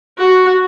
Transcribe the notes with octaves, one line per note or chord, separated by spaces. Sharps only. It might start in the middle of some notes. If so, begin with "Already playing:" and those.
F#4